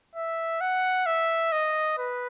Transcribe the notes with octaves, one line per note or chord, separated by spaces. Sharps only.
E5
F#5
E5
D#5
B4